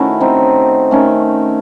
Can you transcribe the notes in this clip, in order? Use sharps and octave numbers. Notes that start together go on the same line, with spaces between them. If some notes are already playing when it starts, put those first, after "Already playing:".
Already playing: D#3 A3 C#4 E4 F#4
C4 D#4
D#3 A3 C#4